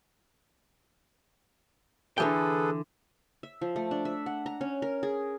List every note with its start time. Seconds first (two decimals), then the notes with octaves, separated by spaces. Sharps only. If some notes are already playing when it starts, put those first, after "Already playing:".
2.18 D3 E3 G#4 A4 B4 G5
3.43 E5
3.61 F3
3.76 A3
3.91 D4
4.05 E5
4.26 F#5
4.46 A#5
4.61 C#4
4.82 A#4
5.03 G#4